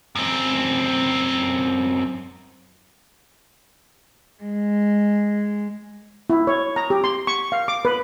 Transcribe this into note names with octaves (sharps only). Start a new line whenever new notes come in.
F#2 C4
G#3
E4
C#5
A#5
G4
C6
C#6
F5
D6
B4